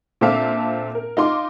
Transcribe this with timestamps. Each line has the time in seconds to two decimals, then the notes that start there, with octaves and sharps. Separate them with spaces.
0.21 A#2 C4 D4 A4 E5 F5
0.95 A#4
1.17 D#4 F4 C6 D6